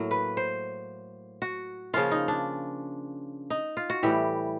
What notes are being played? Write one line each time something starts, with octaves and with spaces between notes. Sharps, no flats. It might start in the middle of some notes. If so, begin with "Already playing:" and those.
Already playing: A2 F#3 A#3
B4
C5
F#4
C#3 F3 A#3 C#4 F4
D#4
D4
D#4
F4
F#4
A2 E3 G3 G4